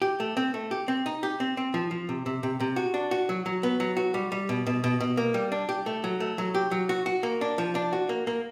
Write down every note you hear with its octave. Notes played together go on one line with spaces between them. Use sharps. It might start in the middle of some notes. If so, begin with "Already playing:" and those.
G4
A3
C4
A3
G4
C4
D#4
G4
C4
C4
F3
F3
C3
C3
C3
C3
F#4
D4
F#4
F#3
F#3
B3
F#3
F#4
G3
G3
B2
B2
B2
B2
A#3
G3
D4
G4
A3
F#3
A3
F#3
G4
F#3
F#4
F#4
A#3
D4
F3
D4
F#4
A#3
A#3